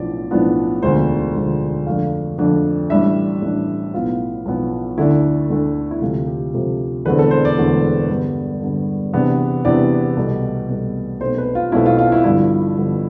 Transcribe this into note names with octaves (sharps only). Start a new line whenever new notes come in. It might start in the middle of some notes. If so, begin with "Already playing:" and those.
Already playing: B1 A2 F3 B3 D4 D5
B1 A2 F3 B3 D4
E1 D2 D3 F3 C5
E1 D2 D3 F3
F2 D3 A3 D4 F5
F2 D3 A3 D4
A1 A2 G3 D4 E5
A1 A2 G3 D4
B1 A2 F3 B3 F4
B1 A2 F3 B3
D2 D3 A3 D4 E4
D2 D3 A3 D4
E4
D2 C3 F3 A3 F4
G4
D2 C3 F3 A3
E1 E2 D3 A3 C4 B4
A4
C5
D5
E1 E2 D3 A3 C4
G2 D3 G3 B3
G2 D3 G3 B3
E2 C3 E3 B3 D4
E2 C3 E3 B3 D4 D5
C2 B2 A3
C2 B2 A3
B1 B2 A3 C4 C5
B4
F4
B1 B2 A3 C4 E4
F4
F4
E4
G2 D3 F3 B3 E4
G2 D3 F3 B3